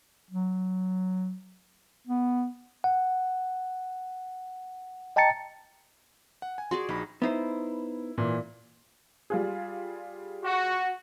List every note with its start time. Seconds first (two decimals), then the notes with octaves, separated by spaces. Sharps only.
0.31 F#3
2.07 B3
2.84 F#5
5.16 D#5 G5 A5 A#5 A6 C#7
6.42 F#5
6.58 G#5
6.71 F#4 G#4 D5 C6
6.89 A#1 D#4 B5
7.22 B3 D#4 E4 C5
8.18 A#2 E3
9.30 G3 F4 G#4
10.44 F#4